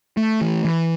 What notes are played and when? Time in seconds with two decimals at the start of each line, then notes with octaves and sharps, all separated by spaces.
0.17 A3
0.41 E3
0.65 E3